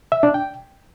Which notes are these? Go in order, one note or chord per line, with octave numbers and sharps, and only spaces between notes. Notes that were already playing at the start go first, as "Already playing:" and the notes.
E5
D4
G5